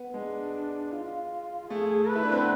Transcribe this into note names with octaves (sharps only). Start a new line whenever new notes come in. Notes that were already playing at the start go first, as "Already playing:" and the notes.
Already playing: B3
G#3 D4
F4
A3 G#4
B4
E4
D4
C4
B3